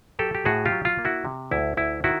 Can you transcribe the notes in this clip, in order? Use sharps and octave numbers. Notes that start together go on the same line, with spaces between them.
F#3 G4 A4
G4
A2 F#4 G#4
F4 G4
F#3
F4
A#3
E4 F#4
C3
D2 E4
D2 E4
D#3 E4 F#4